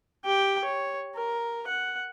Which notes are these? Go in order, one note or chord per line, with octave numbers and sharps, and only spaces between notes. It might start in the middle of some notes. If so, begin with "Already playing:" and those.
G4 G5
C#5
A#4
F#5